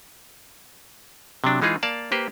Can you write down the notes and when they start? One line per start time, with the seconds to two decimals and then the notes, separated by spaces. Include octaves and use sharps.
1.44 C3 F#3 D4
1.62 E3 G#3 D#4 F4 G#4
1.83 A#3 D5 F5 A5
2.12 A#3 G4 B4 C5